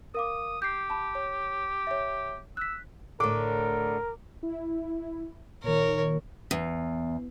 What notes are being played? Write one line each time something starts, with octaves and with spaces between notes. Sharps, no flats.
A#4 F5 D6 D#6
G4 G6 C7
A5 B5
C#5
C#5 E5
E6 F#6 B6
A2 D3 A#4 D6
E4
A#2 D#3 A#4 C#5
E2